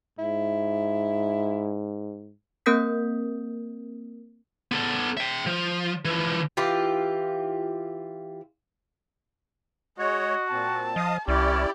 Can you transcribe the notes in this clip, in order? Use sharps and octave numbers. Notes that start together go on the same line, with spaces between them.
G#2 E4
A#3 C4 A#4 D#6 G6 B6
B3 A4
E5 G5
F3
E3 F3
E3 F4 G4
G#3 F#4 C#5 D#5
A#2 C4 A5
F3 D#5 F5 D#6
C2 C#4 E4 G4 D5